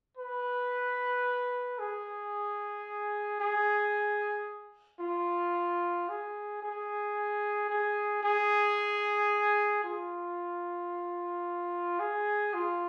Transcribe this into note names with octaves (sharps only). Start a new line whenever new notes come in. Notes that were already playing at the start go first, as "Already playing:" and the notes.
B4
G#4
G#4
F4
G#4
G#4
G#4
G#4
F4
G#4
F4